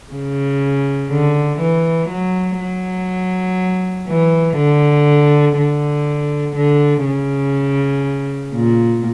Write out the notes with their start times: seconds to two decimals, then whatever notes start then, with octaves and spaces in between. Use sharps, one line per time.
0.12 C#3
1.10 D3
1.60 E3
2.09 F#3
2.60 F#3
4.08 E3
4.57 D3
5.57 D3
6.56 D3
7.06 C#3
8.54 A#2